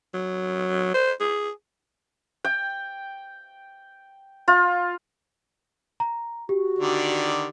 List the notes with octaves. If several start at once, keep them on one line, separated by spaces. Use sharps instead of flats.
F#3
C5
G#4
G5
F4
A#5
F#4 G4
D3 D#3 D5